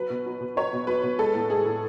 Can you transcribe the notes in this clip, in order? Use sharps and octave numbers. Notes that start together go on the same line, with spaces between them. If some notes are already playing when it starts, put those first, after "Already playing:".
Already playing: F#3 B4
B2
F#3
B2
F#3 C#5
B2
F#3 B4
B2
G#3 A4
A2
G#3 G#4
A2